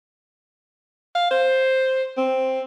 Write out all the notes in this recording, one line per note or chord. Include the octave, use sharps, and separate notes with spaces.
F5
C5
C4